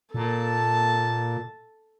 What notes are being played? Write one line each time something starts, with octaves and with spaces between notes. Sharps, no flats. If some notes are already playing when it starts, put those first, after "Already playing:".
A#2 A4 A5